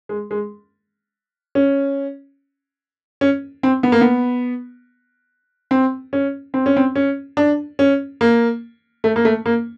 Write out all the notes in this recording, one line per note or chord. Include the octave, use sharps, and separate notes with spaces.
G#3
G#3
C#4
C#4
C4
B3
A#3
B3
C4
C#4
C4
C#4
C4
C#4
D4
C#4
A#3
A3
A#3
A3
A#3